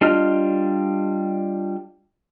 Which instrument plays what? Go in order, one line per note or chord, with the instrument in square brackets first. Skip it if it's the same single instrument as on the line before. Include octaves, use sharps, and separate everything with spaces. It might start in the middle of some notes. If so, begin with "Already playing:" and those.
[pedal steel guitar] G3 D4 F4 D#5 F6